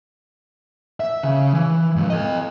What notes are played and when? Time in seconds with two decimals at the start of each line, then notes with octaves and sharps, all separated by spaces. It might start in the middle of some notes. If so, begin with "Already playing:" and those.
1.00 E5
1.23 C#3
1.54 E3
1.96 G#2 F3
2.10 A4 D#5